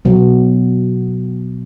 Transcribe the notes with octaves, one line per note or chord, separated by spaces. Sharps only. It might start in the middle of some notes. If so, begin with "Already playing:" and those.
B2 F#3 B3